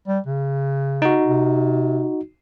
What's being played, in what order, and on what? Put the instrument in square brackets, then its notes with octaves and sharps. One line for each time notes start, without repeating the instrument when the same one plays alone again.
[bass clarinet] G3
C#3
[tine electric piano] D#4 F#4
[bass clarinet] C3